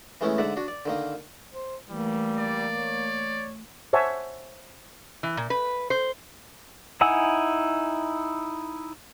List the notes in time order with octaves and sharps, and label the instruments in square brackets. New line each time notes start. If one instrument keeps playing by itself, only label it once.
[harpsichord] E3 G#3 A3 B3 C#4 E4
G#2 D3 D5 E5 F#5
D4 F#4
D5
D3 D#3 A#3
[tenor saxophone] C5
[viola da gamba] E3 A3 [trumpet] G3 [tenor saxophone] A#3
[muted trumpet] D5
[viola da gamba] A3 [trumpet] C#5
[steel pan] C5 C#5 E5 F#5 G#5 A5
[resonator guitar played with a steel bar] E3
A#2
B4
C5
[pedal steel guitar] D#4 E4 F#5 G#5 E6